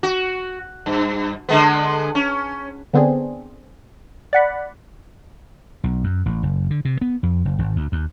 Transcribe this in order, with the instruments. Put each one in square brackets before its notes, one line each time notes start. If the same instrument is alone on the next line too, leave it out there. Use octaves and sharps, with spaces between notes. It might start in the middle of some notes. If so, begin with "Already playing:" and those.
[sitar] F#4
G2
D3 G#3 B3
C#4
[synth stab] D3 B3 C4 D4 G#4
D5 F#5 B5
[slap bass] B1
F#2
A1
F#1
D3
C3
B3
F2
F#1
G#1
D2
D#2